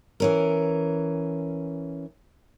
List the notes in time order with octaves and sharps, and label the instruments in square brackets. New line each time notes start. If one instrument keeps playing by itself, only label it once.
[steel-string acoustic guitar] E3 C#4 A#4